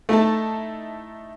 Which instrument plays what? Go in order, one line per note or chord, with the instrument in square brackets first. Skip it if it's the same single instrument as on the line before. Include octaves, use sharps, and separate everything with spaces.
[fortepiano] A3 [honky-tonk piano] D#4 E4 A5